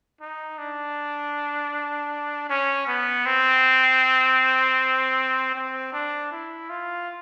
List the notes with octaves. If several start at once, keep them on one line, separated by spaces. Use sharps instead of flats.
D#4
D4
C#4
B3
C4
C4
D4
E4
F4